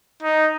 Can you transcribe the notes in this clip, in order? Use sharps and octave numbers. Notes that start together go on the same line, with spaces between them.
D#4